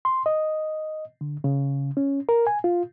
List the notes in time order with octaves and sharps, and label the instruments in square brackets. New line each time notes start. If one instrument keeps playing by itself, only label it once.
[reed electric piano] C6
D#5
D3
C#3
C#4
A#4
G#5
F4